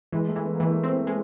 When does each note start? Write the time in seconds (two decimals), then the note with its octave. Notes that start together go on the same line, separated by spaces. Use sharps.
0.12 E3 G#3
0.28 A3
0.36 E3
0.44 B3
0.54 A#3
0.60 E3 A3
0.75 A#3
0.84 C4
1.07 G#3